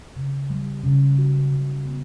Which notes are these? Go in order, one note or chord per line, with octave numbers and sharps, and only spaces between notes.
C#3
G3
C#3
F#4
C#3
B3